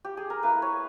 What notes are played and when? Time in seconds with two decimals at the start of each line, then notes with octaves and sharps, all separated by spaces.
0.05 G4
0.17 G#4
0.30 A#4
0.43 A#3 E4 B4
0.62 C#5